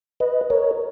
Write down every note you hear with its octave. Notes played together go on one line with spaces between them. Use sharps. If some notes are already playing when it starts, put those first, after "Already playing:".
B4 D#5
A#4 C#5